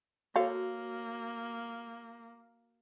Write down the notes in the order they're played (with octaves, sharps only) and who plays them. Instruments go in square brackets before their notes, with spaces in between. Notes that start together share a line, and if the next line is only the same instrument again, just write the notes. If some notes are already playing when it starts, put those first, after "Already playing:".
[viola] A#3 [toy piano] F#4 C#5 [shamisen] A4 F5